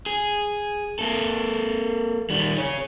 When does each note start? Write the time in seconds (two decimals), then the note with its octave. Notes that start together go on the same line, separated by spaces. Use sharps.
0.06 G#4
0.99 A#3 A4
2.30 D#3 G3
2.57 G#4 C#5